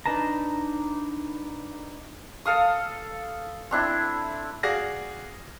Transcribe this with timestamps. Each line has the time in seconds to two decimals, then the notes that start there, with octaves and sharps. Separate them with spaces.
0.06 D4 D#4 B4 A5 A#5
2.45 A4 F5 D#6
3.71 C4 D4 E4
4.63 F#4 G#4 D5 F5 A#6